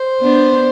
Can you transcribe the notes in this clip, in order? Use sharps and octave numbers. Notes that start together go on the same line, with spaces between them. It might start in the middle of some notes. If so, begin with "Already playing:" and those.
Already playing: C5
B3 D4